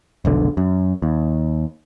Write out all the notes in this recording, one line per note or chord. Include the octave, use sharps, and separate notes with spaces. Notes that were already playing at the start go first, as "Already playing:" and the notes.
F1 B1 D3
F#2
D#2